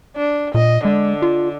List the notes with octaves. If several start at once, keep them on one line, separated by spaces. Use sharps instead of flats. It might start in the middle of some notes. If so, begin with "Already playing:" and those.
D4
A#2 D#5
D3 G#3
F4